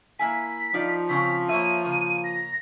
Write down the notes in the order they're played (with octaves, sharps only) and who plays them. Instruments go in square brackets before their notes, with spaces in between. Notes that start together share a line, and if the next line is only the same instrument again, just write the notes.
[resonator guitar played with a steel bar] A#3 E4 G#5 [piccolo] B6
[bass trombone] F3 [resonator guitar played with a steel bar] D#4 F4 D5
[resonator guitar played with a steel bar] C#3 C4 C#4 [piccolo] B6
[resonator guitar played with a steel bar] A#3 C#5 E5 [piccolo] D#7
[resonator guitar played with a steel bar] C#3 A#3
[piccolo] A#6